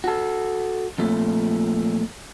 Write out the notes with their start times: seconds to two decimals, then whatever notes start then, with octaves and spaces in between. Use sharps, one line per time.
0.04 F#4 A4
0.98 F2 A#2 A3